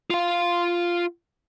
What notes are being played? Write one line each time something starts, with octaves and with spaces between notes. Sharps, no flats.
F4 F5